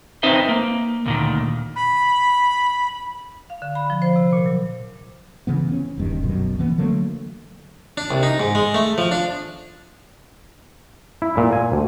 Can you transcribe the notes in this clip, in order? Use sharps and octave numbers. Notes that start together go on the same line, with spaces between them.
C4 D#4 B4 C5 E5
A#3
D2 A#2 D#3
B5
F5
D3
B5
F3
C5
C3
A#2
F#3
C#3 E3 B3
B3 C#4
D#1 G2 D#3
F1 B1 F#2 B2
E3 A#3 B3
D3 F#3 A3 A#3
D4
C2
D#4
G#2
G#3
A3
F3
D4
E4
A#2
G#5
D2